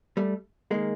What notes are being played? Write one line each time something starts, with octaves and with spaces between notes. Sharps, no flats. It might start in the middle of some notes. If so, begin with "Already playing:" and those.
G3 A3
D#3 G#3 A#3